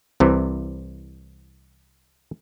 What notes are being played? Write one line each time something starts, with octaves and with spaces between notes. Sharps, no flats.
C2 C3 E3